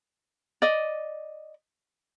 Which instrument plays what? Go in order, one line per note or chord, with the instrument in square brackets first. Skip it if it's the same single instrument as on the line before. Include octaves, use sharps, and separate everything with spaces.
[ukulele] D5 D#5